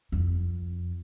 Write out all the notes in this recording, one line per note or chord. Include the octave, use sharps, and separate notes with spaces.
F2